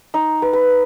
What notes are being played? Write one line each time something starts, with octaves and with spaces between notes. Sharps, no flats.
D#4
B4
B4